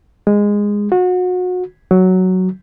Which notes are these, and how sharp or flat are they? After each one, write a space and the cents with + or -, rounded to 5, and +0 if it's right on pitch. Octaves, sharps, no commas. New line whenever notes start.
G#3 -15
F#4 -30
F#3 +5